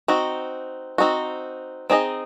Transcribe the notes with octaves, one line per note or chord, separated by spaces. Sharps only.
C4 D#4 F#4
C4 D#4 F#4
C4 D#4 G#4 D#5